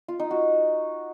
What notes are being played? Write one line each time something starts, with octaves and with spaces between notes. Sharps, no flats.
F4
D#4
F#4